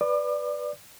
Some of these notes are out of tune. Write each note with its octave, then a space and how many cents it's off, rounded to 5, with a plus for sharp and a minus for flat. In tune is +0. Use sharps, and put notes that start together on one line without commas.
B4 +0 D5 +0 D6 +40